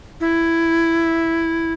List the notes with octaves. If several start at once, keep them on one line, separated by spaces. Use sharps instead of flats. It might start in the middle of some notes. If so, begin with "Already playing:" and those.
E4